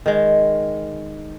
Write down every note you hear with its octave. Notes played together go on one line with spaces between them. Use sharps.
D#3 G#3